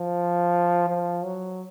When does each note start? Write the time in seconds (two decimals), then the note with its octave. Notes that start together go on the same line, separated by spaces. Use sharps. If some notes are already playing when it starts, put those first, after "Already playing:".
Already playing: F3
0.89 F3
1.24 F#3